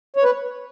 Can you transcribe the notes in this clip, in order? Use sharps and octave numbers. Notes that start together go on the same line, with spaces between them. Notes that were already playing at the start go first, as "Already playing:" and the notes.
C#5
B4